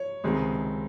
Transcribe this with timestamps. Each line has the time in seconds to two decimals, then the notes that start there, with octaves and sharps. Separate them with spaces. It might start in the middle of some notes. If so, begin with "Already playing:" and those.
Already playing: C#5
0.24 C#2 C3 D#3 G#3 C4